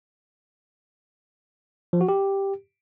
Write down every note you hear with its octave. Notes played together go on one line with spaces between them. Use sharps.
F3
F#4
G4